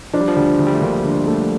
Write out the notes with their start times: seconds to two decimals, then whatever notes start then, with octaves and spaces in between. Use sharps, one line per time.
0.13 F3 D4
0.21 G3
0.28 F3
0.36 D2 G3
0.59 D2
0.67 G3
0.74 A3
0.81 D2 A#3
1.04 D3
1.27 A3